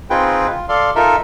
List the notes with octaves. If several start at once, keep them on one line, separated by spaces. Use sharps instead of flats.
C4 D#4 F4 G#4 B4 G5
F4
A4 D5 F5 C6
D#4 F4 A4 A#4 E5